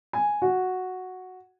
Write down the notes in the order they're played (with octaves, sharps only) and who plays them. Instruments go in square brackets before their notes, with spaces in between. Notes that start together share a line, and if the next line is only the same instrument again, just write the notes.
[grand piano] G#5
F#4